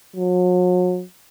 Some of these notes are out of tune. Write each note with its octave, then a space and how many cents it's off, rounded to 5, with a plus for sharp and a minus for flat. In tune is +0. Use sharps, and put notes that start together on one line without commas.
F#3 -40